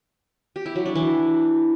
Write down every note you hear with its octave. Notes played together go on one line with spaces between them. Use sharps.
G4
E4
F#3
D4
E3